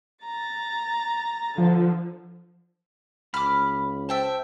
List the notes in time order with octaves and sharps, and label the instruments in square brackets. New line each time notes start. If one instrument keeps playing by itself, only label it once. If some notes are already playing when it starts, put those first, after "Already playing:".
[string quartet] A#5 A6
[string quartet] D3 [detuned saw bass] F3
[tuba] C#2 [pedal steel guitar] B5 [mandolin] D6 F6
[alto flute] C5 [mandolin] E5 G5 A5